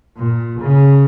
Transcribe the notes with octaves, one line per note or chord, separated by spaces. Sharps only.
A#2
C#3